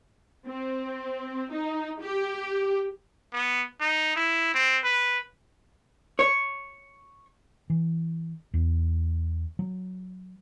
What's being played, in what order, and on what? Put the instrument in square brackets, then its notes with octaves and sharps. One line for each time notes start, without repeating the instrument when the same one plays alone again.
[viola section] C4
D#4
G4
[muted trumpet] B3
D#4
E4
C4
B4
[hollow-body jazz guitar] C#5
[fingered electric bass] E3
E2
F#3